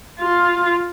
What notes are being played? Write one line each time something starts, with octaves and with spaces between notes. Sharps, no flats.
F4